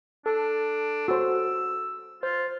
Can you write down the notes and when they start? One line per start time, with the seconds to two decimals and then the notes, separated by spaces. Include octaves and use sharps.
0.26 D4 A4
1.08 F#4 C5 E6
2.23 F4 C5